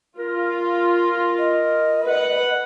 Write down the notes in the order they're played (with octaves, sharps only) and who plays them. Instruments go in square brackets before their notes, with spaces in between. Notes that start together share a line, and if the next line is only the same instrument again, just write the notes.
[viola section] F4 [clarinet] A#4
[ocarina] D#5
[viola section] B4 F#5